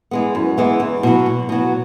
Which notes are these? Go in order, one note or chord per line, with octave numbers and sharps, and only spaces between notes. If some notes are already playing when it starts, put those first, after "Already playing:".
E3 G#3 B3
F#2
E3 G#3 B3
E2
B2 F#3
E2
B2 F#3